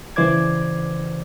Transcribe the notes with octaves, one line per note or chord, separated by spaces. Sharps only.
C#3 E3 C5 D5 D6 G#6